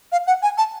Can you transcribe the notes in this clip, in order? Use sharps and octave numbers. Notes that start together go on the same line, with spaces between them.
F5
F#5
G#5
A5